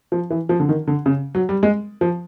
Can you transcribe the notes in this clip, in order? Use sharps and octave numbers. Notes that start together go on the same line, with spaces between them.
F3
E3
F3
D3
D#3
D3
C#3
F#3
G3
G#3
F3